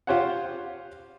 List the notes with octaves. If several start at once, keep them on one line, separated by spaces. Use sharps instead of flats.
F4 G4 C5 C#5 F#5